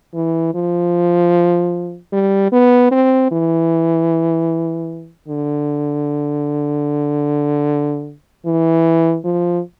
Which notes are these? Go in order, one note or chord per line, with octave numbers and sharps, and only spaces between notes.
E3
F3
G3
B3
C4
E3
D3
E3
F3